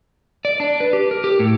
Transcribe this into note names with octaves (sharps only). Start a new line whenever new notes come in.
D5
D4
B4
G4
A#4
G4
A2